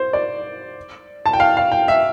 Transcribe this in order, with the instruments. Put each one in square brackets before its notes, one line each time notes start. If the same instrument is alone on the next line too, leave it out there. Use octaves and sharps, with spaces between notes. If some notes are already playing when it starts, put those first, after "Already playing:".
Already playing: [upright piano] C5
D5
A5
G5
F5
F5
G5
E5